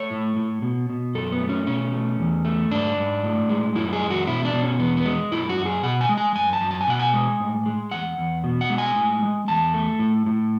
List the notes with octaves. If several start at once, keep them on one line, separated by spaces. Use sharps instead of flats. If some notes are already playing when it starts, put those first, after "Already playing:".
Already playing: A3 C#5
A2
A2
B2
B2
F#2 A4
B3
A3
C#4
B2 C#4
A3
E2
A3
G#2 D4
G#2
A2
G#3
F#2 E4
G#4
G#3
F#4
B2 E4
D4
B2
C#4
E2 B3
B3
G#3
F#2 E4
F#4
F#2
G#4
B2 F#5
G#5
G#3
G#5
F#2 G#5
A5
F#2
A5
G#5
B2 F#5
G#5
G#3
A2
G#3
E2 F#5
E2
B2
F#5
G#3
G#5
A2
G#3
E2 A5
A3
A2
A2